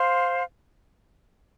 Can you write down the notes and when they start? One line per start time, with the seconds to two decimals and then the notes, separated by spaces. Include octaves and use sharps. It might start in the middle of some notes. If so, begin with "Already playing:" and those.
Already playing: C5 F5 C6